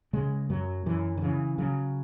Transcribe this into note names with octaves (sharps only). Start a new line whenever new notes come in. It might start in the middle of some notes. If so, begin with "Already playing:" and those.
C#3 G#3
F#2 F#3
F#2 E3
D#3
C#3 E3
C#3 F#3